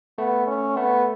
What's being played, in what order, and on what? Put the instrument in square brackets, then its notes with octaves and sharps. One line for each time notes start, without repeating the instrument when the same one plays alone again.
[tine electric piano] A3 [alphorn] B3
[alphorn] C#4
[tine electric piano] A3 [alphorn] B3